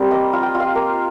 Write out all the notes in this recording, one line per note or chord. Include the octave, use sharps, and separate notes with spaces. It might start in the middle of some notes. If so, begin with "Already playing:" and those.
Already playing: G3 C4 F4 A#4
A#3 D#5
F4
G5
F4
F5
A#3